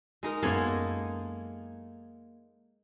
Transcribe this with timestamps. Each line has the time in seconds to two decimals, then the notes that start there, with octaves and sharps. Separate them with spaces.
0.23 G#3 D#4 A#4
0.43 F#2 G#3 A#3 B3 A4 G#6